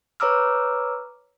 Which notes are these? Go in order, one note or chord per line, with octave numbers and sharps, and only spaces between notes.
B4 C#5 A#5 D6 E6 F6